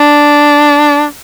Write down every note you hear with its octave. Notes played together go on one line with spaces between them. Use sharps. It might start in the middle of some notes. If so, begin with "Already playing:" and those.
Already playing: D4